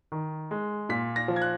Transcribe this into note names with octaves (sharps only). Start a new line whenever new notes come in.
D#3
G#3
A#2 B6
A#6
F3
G#6
F#6